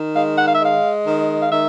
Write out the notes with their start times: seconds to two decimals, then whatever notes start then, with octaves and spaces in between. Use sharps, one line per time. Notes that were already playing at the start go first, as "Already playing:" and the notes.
Already playing: D#3
0.15 G#3 F5
0.37 F#5
0.46 F5
0.55 E5
0.60 G#3 F5
1.06 D#3
1.41 F5
1.50 D#3 E5